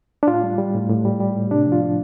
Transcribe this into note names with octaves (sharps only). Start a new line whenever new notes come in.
D4
A2 F4
G3
G3
A2
A2
G3
G3
A2
C3 D4
F3
F4
F3